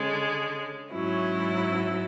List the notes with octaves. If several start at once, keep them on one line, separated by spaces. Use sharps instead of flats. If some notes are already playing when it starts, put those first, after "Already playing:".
Already playing: D3 G#3 C#4
G#2 F#3 C#4 E4